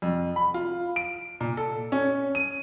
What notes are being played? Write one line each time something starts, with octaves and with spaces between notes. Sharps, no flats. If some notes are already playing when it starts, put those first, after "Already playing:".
F2
B5
F4
D7
A#2
A4
C#4
D#7